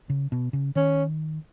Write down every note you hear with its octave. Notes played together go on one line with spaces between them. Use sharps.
C#3
B2
C#3
D#3 C#4